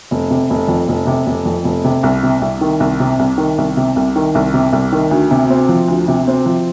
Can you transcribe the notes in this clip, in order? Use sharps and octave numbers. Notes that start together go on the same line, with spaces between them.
F1
C3
F1
F2
F1
C3
F1
F2
F1
C3
C2
C3
C2
D#3
C2
C3
C2
D#3
C2
C3
C2
D#3
C2
C3
C2
D#3
D2
C3
C4
F3
D2
C3
C4
F3